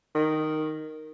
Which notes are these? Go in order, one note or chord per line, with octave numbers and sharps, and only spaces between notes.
D#3